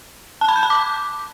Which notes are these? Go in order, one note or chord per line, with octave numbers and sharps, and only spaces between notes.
A5
B5
G6
A5
D6